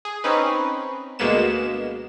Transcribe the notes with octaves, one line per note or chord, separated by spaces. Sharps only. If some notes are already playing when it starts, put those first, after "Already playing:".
G#4
C4 C#4 D#4 B4
D2 B2 G#3 A#3 B3 E7